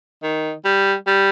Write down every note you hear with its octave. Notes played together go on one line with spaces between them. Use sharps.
D#3
G3
G3